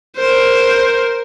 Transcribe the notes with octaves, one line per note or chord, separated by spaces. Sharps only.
A#4 C5